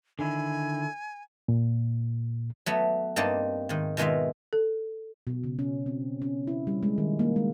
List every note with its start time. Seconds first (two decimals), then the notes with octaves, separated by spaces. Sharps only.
0.19 D3 D#3 E4 G#5
1.48 A#2
2.66 F#3 A3 B3
3.16 G2 A#3 C4 D#4 D5 A5
3.69 G#2 D#3
3.97 B2 D#3 G#3 F4 E5
4.53 A4
5.27 B2
5.44 C#3
5.59 C#4
5.86 C4
6.22 C#4
6.47 E4
6.67 G3
6.83 G#3
6.98 D#3
7.19 A#3
7.36 G#3